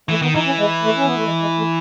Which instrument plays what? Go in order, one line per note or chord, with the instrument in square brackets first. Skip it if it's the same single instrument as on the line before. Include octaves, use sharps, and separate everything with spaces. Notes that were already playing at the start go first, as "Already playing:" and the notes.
[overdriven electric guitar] E3 [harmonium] A3
[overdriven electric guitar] D#3 [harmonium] B3
[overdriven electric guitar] E3 [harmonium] D#4
[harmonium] C#4
G#3
A3
C#4
B3
A3
G#3
G#3
A3